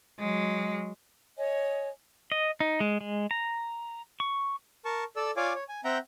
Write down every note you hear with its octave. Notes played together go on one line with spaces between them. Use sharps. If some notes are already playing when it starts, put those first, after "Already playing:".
F#3 G#3
C#5 D#5 G#5
D#5
D#4
G#3
G#3
A#5
C#6
A#4 A5 C#6
A4 D5 E6
F4 C#5 D5 F5 G#5 D6
C#5
G#5
C4 E5 F#5 G5 A#5 G6